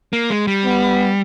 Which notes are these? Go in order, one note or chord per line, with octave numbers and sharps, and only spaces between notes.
A#3
G#3
G3
B3